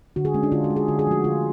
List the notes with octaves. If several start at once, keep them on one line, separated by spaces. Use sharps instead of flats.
D3 F#4
G#4
G#3 C#4
D4
D3 F4
F#4
G#3
G#4
D3 F#4
G#4
F3 A3 F#4
D3 F4